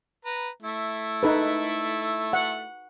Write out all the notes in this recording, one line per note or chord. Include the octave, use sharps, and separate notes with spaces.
B4 A#5
A3 E4
D#4 A4 B4
F#5